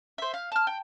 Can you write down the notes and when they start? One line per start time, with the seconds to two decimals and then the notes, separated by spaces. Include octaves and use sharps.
0.18 C5 E5
0.34 F5
0.52 A5 F6
0.67 G5